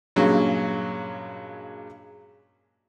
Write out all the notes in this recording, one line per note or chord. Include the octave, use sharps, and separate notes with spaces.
G2 A#2 C#3 F#3 G#3